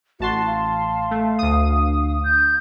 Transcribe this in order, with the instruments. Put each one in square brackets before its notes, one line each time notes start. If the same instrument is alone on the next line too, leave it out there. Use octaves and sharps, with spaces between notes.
[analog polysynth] A1 A5 C6 [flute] F#4
[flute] F5
[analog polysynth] A3
D2 D#6
[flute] G6